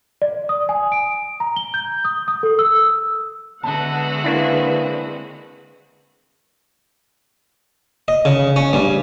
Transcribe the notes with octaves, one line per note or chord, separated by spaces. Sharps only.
D5
D#6
G#5
D7
A#5
G7
G6
D#6
D#6
A4
E6
D3 G#3 B3 F#4 E5 F#5 A5
A#3 C4 D4 E4 B4
D#5
C#3
C#4
G2